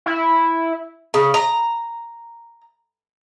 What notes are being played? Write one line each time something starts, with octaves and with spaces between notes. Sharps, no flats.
E4
C#3
A#5